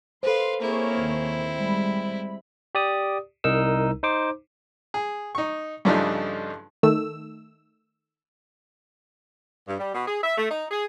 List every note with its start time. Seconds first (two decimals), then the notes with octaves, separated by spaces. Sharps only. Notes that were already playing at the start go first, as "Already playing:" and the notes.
0.23 A4 B4 C5 F5 C6
0.61 A#3 C4 E4 G#4 C#5
0.95 D#2 D#3
1.57 G3 G#3 B5
2.75 G4 D5 D#6
3.44 C2 D#4 A#4 E6
4.03 D#4 C5 D6
4.94 G#4
5.35 D#4 C#6
5.85 G2 C#3 F3 A3 D4 D#4
6.83 D#3 A3 E6
9.67 G2
9.79 G3
9.94 B2
10.07 G#4
10.23 E5
10.38 A3
10.50 D#4
10.71 G#4